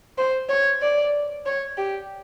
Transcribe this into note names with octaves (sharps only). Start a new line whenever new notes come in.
C5
C#5
D5
C#5
G4